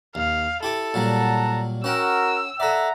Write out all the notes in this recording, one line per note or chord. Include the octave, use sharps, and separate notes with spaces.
D#2 F5
E4 G4 A4 D6
A#2 F#3 G3 F#5 A5 A#5
C#4 F#4 A#4 F#5 G5 E6
A4 D5 E5 F#5 A#5